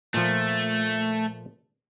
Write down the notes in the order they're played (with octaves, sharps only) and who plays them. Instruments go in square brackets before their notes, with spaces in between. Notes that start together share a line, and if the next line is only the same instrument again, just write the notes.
[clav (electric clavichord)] A#2 F3 [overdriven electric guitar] A3